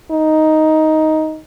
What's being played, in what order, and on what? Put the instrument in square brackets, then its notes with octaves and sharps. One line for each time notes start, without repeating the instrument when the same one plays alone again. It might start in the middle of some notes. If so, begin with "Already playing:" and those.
[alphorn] D#4